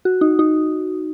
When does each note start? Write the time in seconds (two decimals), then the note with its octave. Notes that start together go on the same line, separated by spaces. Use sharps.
0.05 F#4
0.21 D#4
0.39 D#4